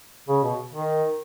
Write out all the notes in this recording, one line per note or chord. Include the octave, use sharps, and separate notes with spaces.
C#3
B2
D#3